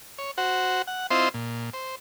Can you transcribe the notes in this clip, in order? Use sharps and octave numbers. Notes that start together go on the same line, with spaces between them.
C#5
F#4 C5 F#5
F#5
C4 E4 F4 C5 D#5 C6
A#2
C5